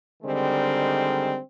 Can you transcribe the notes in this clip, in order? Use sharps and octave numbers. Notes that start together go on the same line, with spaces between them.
D3 D#3 G3 G#3 C4